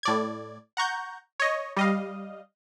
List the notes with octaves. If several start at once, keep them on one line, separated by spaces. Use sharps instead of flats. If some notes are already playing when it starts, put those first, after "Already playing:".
A2 D5 G#6
F#5 A#5 C#6 G6
C#5 D#5
G3 D#5 F5